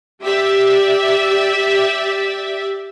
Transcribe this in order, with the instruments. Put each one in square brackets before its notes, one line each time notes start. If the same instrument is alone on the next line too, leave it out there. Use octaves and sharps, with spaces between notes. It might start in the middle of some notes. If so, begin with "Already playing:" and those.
[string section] G4 D5 E5